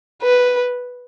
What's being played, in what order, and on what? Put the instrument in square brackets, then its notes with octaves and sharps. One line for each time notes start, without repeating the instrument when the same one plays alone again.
[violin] B4